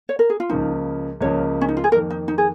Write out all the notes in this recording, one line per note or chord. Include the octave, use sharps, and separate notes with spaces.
C#5
A#4
G#4
F4
C#2 C#3 F3 A#3 D#4
C#2 C#3 F3 A#3 C#5
C#4
D#4
F4
G#4
F2 D#3 A#3 A#4
D#4
D#4
G#4